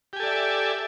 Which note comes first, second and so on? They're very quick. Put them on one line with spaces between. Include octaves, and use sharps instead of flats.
G4 G#5 A4 D5 E5